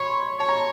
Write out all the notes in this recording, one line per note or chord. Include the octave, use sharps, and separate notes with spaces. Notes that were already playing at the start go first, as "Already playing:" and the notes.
Already playing: C#5 B5 C6
C#5 A5
A#5